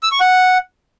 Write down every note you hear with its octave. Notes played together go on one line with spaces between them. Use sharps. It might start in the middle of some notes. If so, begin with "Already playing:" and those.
E6
C#6
F#5